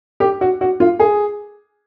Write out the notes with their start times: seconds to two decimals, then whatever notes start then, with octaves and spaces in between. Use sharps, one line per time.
0.20 G4
0.41 F#4
0.61 F#4
0.80 F4
0.99 G#4